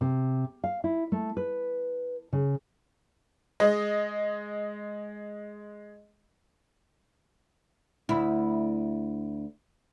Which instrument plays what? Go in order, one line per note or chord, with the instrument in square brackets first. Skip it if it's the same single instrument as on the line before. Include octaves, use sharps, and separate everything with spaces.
[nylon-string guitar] C3
F5
E4
A3
B4
C#3
[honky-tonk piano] G#3 D#5
[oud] D2 E4